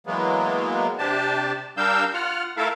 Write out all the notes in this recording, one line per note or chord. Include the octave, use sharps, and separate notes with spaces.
E3 F#3 G#3 A#3 B3
C3 D4 G4 A5
G3 D4 A#4 F5 E6 G6
F4 F#5 F6
A3 E4 A4 A#4 E5 F5